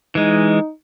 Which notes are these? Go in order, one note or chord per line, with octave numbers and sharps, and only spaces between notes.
E3 G#3 D#4